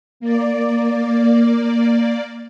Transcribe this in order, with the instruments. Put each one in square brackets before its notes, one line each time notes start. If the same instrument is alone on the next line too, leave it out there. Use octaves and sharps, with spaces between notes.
[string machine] A#3 D5